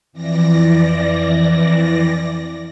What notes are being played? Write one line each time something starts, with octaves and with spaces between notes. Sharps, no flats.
F2 E3 D5 A#6